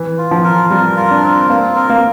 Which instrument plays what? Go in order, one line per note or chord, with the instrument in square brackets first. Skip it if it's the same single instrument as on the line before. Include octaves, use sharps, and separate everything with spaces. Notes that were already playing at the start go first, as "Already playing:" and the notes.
Already playing: [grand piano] E3
[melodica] F4
[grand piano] F3
[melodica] A#4
[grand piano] G3 [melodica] A#4
[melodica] F4
[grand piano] D4
[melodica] C4
[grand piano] A#3 [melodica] F4
[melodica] A#4
[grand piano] A#3